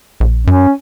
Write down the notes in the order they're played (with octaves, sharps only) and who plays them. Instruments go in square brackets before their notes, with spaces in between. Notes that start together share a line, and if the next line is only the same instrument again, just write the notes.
[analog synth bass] A#1
[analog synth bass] F#2 [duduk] C#4